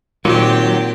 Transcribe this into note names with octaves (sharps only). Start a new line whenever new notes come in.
A#2 D#3 F#3 C4 G4